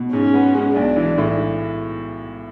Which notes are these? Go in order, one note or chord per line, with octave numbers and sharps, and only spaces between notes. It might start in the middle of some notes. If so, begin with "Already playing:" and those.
Already playing: B2
G#2 C#4
B3
G#3
B1 D4
E3
A2